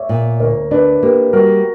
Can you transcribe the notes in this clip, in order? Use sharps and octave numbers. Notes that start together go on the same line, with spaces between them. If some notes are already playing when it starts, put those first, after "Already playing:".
Already playing: C#5 D5 E5
A#2
D2 A#4 C#5
D4 B4 D5
A#3 G4 B4
G3 F#4 A#4